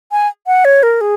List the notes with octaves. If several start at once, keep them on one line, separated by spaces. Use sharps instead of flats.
G#5
F#5
C#5
A#4
G#4